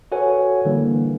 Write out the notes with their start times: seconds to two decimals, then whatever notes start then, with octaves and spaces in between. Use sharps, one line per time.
0.12 F#4 A4 B4 C#5 F#5 G#5
0.65 D3 E3 G3 A#3